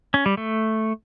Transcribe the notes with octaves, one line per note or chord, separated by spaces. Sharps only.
C#4
G3
A3